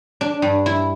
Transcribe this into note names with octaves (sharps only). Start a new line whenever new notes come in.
D4
G2
E4